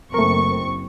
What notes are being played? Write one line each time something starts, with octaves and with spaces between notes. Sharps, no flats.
F#1 A3 C4 A#4 C#6